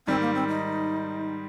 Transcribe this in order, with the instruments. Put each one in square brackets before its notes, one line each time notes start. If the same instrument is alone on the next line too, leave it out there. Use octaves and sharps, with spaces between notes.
[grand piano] G#2 D#3 G3 [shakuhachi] C4
[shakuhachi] A#3
C4
D#4